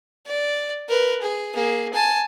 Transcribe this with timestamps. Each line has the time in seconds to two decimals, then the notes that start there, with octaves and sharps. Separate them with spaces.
0.26 D5
0.89 A#4 B4
1.22 G#4
1.55 A#3 G#4
1.94 G#5 A5